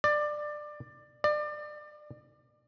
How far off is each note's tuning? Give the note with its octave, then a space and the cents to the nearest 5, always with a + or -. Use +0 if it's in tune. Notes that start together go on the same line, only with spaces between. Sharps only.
D5 +20
D5 +30